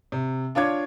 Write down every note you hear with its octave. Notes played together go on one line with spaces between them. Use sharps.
C3
D4 F4 C#5 D6 G#6